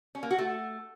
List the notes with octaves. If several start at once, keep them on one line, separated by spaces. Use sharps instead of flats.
C#4
A#3
F#4
A3